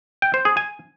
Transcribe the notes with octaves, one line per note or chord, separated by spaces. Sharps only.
G5
C5
G#4
G#5